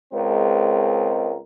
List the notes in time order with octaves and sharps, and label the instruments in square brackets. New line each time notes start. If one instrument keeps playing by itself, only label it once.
[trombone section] C#2 G#3 C4 A#4